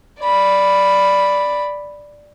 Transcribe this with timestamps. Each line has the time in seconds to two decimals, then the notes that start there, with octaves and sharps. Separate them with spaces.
0.21 D5 B5